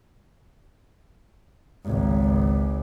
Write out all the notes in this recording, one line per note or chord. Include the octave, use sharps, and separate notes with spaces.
G#1 C#2